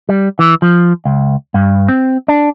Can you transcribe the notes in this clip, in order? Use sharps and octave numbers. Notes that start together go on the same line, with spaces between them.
G3
E3
F3
C#2
G2
C4
D4